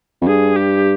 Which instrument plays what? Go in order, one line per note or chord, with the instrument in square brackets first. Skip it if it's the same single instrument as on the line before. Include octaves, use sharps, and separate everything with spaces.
[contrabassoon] F2
[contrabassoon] G2 [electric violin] G#4
[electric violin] G4